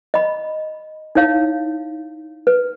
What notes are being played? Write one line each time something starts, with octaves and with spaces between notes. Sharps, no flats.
D#5 B5
D#4 E4 C#5 F5
B4